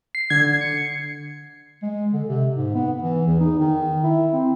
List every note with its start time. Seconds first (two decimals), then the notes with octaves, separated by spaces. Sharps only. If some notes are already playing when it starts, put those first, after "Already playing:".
0.15 C7
0.30 D3 G#6
0.61 C#7
1.82 G#3
2.13 D3
2.28 C3
2.56 G#2
2.75 B3
3.03 E3
3.27 E2
3.40 D#4
3.60 D#3
4.04 E4
4.33 C4